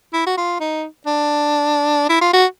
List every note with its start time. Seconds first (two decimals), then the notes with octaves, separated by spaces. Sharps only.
0.13 E4
0.26 F#4
0.37 F4
0.60 D#4
1.06 D4
2.09 E4
2.21 F4
2.33 F#4